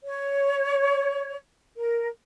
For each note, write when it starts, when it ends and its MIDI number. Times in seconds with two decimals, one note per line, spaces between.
0.05 1.35 73
1.77 2.06 70